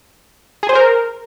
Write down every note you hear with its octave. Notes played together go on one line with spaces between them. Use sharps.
G#4
C5
A#4